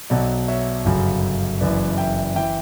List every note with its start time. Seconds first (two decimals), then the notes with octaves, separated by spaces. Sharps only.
0.10 B1 B2 F#3 D5 F#5
0.48 C#5 E5
0.85 G1 F#2 C#3 F#3
1.61 F#1 F#2 E3 B4 D5
1.98 E5 G5
2.35 E3 E5 G5